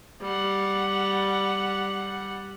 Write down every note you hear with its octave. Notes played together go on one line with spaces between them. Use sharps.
G3 F#5